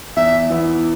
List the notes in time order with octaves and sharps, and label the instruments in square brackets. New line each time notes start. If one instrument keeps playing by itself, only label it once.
[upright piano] E2 [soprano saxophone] E5
[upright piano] E3 B3 E4